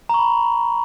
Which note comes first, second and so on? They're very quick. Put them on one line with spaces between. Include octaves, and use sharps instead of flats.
A#5 C#6 B5